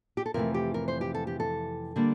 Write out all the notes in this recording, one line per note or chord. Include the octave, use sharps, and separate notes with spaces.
G4
A4
F2 C3 E3 A3 A#4
G4
A#4
C5
G4
A4
G4
A4
D3 G3 A#3